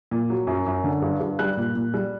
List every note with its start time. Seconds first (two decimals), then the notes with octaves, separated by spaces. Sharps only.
0.11 A#2
0.30 F#3
0.47 F#2
0.66 F#2
0.84 D3
1.02 G2
1.20 G2
1.39 G3 F#6
1.57 A#2
1.75 A#2
1.94 G3